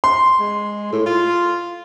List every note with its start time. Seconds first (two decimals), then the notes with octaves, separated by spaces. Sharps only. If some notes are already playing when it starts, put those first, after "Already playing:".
0.04 C6
0.40 G#3
0.92 A2
1.06 F4